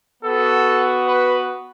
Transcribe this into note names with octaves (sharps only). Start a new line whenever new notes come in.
B3 F#4 A4
B4